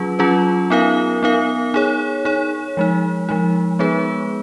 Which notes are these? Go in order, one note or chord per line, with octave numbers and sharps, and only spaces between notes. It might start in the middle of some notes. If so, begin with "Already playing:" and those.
Already playing: F#3 C#4 F4 G#4 B4
F#3 C#4 F4 G#4 B4
B3 D#4 A#4 F5
B3 D#4 A#4 F5
D#4 G#4 C#5
D#4 G#4 C#5
F3 G#3 D#4
F3 G#3 D#4
G#3 B3 D#4 G#4 B4